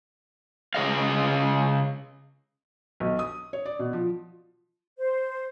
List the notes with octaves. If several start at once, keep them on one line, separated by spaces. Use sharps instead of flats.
C#3 G#4 D#5 F5
B1
D#6
C#5
D5
B2
F3
C5